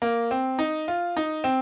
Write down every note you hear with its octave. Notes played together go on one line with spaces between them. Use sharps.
A#3
C4
D#4
F4
D#4
C4